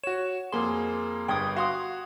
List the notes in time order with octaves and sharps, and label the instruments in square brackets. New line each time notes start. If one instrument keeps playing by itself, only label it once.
[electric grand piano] F#4 C#5 [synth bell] E7
[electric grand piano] F2 A#3 G#4 [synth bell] C6
[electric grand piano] G1 G2 G#6 [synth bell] G5 D#6
[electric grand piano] F#4 [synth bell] F5 C6 D#6